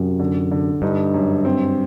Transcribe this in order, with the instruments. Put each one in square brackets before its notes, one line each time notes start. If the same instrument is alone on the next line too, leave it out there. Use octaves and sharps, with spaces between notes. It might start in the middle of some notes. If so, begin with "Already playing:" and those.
Already playing: [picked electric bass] F#2 [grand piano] C3
[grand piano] D3
D3
[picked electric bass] G2 [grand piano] D#4
[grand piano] F#2
C4